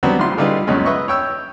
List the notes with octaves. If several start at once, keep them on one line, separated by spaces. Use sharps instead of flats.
F#3 G3 B3 C4 D4 F#4
A1 G3 F4 C6
D3 G3 D#4 F4 G#4 B4
C#2 F#2 B2 G#3 C#4
B4 D#5 E5 C#6
C#5 G5 E6